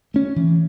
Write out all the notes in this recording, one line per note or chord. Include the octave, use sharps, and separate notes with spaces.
A3 C#4
E3